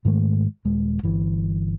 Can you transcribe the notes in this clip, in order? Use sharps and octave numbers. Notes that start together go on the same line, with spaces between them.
G#2 D#3 G#3 A3
D#1 G#3
G1 E3